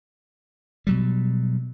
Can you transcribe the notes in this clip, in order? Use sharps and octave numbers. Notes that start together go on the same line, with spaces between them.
B2 F#3 G3